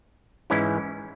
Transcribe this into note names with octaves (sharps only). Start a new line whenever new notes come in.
G#2 E3 G#3 C#4 E4